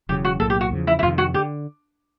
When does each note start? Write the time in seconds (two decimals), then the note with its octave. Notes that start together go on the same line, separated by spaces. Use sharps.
0.09 E1 E2 C#3 F#3 G4
0.25 F#4
0.40 B1 A2 F#3 A#3 A4
0.50 G4
0.61 F#4
0.71 E2 C#3 F3
0.87 E4
0.99 E4
1.03 F2 C3 D#3 F4
1.18 F#4
1.34 D3 G4